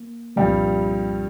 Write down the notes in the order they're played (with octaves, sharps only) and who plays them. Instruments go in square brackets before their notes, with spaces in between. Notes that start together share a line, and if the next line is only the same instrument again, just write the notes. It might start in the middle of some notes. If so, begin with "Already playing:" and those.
Already playing: [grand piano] A#3
[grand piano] C2 A#2 F3 C4 [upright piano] G2 G3